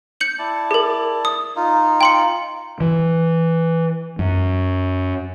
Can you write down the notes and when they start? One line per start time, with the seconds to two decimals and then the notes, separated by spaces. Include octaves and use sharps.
0.20 G6 C#7 F#7
0.39 E4 D5 A5
0.71 G#4 A#4
1.25 D#6
1.56 D#4 F4
2.01 G5 C6 C#7
2.80 E3
4.19 F#2